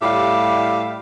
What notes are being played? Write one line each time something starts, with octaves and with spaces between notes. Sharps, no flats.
A2 G3 G4 E5 F5